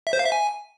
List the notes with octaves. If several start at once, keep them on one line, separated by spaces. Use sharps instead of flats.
E5
C5
F5
E5
G#5